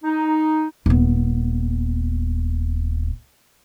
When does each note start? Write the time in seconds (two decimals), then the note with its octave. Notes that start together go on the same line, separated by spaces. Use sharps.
0.04 D#4
0.86 D#1 B3